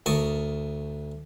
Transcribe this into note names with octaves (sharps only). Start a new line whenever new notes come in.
D2 A#4 A5 C#6 D#6